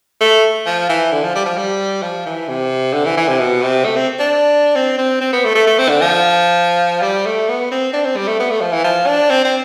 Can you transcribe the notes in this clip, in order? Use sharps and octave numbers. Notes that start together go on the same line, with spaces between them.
A3
F3
E3
D3
F3
G3
F3
G3
F3
E3
C3
D3
E3
E3
C3
B2
C3
A3
C4
D4
C4
C4
C4
B3
A3
A3
A3
C4
D3
F3
G3
A3
B3
C4
D4
C4
G3
A3
B3
A3
F3
E3
F3
D4
C4
C4